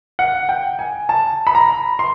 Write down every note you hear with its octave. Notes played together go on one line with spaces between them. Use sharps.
F#5
G5
G#5
A5
B5
A#5
C6